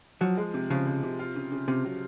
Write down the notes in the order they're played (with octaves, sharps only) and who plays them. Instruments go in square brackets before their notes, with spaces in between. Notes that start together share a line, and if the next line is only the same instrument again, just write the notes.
[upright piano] F3 [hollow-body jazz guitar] F#3
[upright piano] G#3
C3
[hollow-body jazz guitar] C#3 [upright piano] F3
[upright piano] F3
C3
F4
C#3
C#3
[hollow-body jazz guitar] C3 [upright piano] F4
[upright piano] F#3